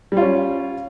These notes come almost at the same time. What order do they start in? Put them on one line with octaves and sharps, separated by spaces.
G3 F4 C#4